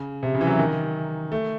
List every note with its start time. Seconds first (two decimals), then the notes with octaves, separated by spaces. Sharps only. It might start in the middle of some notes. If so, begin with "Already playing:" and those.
Already playing: C#3
0.23 C3
0.34 C#3
0.41 E3
0.47 F#3
0.59 D#3
1.32 A3